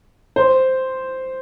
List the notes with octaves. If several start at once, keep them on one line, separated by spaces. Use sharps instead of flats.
C5